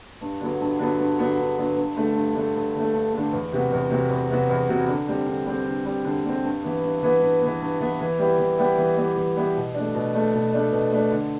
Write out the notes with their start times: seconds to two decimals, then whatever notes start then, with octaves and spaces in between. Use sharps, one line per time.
0.21 G2
0.40 D3 F#3 B3
0.61 G2
0.79 D3 F#3 B3
1.00 G2
1.19 D3 F#3 B3
1.38 G2
1.58 D3 F#3 B3
1.77 G2
1.96 D3 A3
2.15 G2
2.36 D3 A3
2.55 G2
2.74 D3 A3
2.93 G2
3.13 D3 A3
3.33 E2
3.52 C3 F#3 B3 F#4
3.72 E2
3.90 C3 F#3 B3 F#4
4.10 E2
4.29 C3 F#3 B3 F#4
4.49 E2
4.69 C3 F#3 B3 F#4
4.88 D3
5.08 G3 C4
5.27 D3
5.46 G3 C4
5.66 D3
5.85 G3 C4
6.05 D3
6.25 G3 C4
6.45 G2
6.63 E3 B3
6.83 G2
7.03 E3 B3
7.21 G2
7.42 E3 B3
7.61 G2
7.80 E3 B3
8.00 E3
8.19 G3 B3 E4 G4
8.39 E3
8.58 G3 B3 E4 G4
8.78 E3
8.97 G3 B3 E4 G4
9.16 E3
9.36 G3 B3 E4 G4
9.56 B2
9.74 A3 D4
9.94 B2
10.14 A3 D4
10.34 B2
10.53 A3 D4
10.72 B2
10.92 A3 D4
11.11 D3